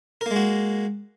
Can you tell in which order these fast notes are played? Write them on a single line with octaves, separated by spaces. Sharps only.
A#4 A#3 G#3 F#4